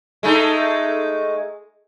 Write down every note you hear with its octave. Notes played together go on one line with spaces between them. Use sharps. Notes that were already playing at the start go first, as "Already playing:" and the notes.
G#3 A3 D#4